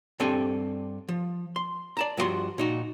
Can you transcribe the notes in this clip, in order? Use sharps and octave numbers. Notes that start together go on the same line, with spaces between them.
G2 G3 C4 D4 A4 G#5
F3
C6
D5 A5 A#5
G2 F3 E4 F#4 C6
A#2 D#4 F#4